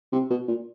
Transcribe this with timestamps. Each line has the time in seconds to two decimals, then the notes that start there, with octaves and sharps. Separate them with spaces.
0.12 C3
0.30 B2
0.48 A#2